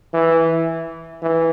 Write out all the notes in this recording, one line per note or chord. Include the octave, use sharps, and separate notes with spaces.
E3
E3